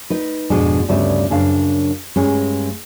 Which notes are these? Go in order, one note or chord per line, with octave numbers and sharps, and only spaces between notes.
D#4 B4
F2 G#2 B2 G#3 D4
D2 G2 C#3 G3 B3 E5
F#2 C#3 D4 F5
G2 G#3 C#4